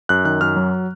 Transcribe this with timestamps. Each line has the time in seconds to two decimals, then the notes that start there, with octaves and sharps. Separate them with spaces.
0.09 F#2 F#6
0.25 D#3 F#6
0.41 F#2 F6
0.56 F#3